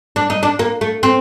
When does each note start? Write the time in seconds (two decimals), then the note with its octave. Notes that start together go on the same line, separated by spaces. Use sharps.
0.16 D4
0.30 D#4
0.43 D4
0.59 A#3
0.81 A3
1.03 C4